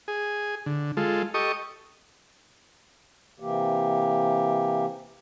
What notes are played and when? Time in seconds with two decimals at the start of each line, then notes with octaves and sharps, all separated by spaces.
0.08 G#4
0.66 D3
0.97 G#3 F4 A4
1.34 G4 A4 D#5 C#6 D#6
3.40 C3 E3 A#3 G4